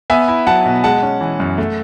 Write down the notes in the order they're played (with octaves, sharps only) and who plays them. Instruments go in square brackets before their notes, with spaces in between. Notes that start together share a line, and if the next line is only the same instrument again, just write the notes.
[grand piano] B3 E5 G#5
E4
F#3 F#5 A5
B2
G#3 F#5 A5
C#4
E3
F#2
A3